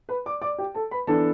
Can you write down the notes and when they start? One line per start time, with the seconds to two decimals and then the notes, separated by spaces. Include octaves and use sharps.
0.09 B4 B5
0.26 D5 D6
0.42 D5 D6
0.58 G4 G5
0.74 A4 A5
0.91 B4 B5
1.07 E3 B3 D4 A4 A5